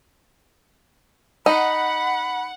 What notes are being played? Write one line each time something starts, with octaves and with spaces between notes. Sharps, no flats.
D#4 F#5 B5